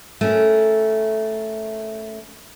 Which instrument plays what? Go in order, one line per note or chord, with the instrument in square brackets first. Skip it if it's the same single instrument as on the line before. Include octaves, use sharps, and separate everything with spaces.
[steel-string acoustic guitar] A3 C#4 A#4